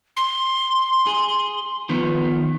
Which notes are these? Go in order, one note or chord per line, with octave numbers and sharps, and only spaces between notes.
C6
G#4
D#3 F3 B3